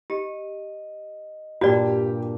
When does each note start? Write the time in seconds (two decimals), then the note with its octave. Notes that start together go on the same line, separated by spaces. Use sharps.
0.10 G4 D#5
1.61 G2 A#2 F#4 G4 D5